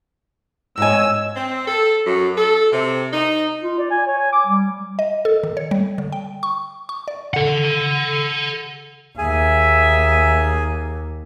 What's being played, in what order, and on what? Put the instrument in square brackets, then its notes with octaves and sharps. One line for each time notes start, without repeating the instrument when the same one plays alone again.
[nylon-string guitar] G#2 G#5 [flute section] C#5 D#5 [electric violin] E6
[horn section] C4
A4
F#2
A4
C3
D#4
[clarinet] F4
D5
G#5
C#5
G#5
D6
G3
[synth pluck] D#5
A4
D#3
C#5
G3
D3
G5
C#6
C#6
D5
[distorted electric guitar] A4 F#5
[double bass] D#2 [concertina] G#4 G#5 [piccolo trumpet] E5